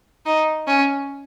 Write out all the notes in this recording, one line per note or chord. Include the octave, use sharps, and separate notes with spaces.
D#4
C#4